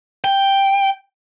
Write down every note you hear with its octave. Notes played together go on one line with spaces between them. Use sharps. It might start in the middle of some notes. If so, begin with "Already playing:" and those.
G5